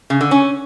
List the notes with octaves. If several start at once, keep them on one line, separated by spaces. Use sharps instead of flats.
C#3
D3
C#4